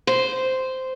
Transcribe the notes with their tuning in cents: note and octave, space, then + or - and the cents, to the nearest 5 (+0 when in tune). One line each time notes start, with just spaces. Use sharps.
C5 -10